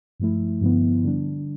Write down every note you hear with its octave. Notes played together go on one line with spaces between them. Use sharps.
G2 F3 A3 E4
G2 D3 F3 B3 E4
D3 G3 D4